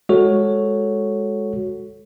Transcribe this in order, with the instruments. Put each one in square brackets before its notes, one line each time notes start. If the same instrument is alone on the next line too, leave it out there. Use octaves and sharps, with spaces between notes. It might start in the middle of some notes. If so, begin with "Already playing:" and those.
[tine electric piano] G#3 F#4 A4 C#5